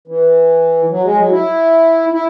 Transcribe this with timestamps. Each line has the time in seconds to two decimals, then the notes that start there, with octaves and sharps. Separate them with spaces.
0.08 E3
0.90 F#3
1.04 G#3
1.18 F#3
1.31 E4
2.12 E4